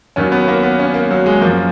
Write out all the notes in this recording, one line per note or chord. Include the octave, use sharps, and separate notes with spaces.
D#2 D#3 F#3 C#4
B3
A#3
B3
C#4
A#3
F#3
G#3
F#2 F3 A#3